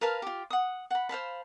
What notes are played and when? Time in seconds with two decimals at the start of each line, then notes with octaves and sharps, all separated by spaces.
0.01 A#4 B4 F5 A5
0.22 F4 G4
0.50 F#5 D#6
0.91 F#5 B5
1.09 C5 F5 A5 B5